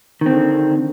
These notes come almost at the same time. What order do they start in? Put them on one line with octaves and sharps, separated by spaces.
D#3 C4 D3